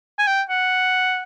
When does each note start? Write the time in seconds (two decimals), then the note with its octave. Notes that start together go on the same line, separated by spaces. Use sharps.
0.19 G#5
0.27 G5
0.50 F#5